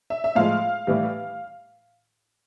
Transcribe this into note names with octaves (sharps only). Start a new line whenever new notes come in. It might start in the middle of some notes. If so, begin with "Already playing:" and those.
E5
E5
A2 F3 G#3 F5
A2 E3 G3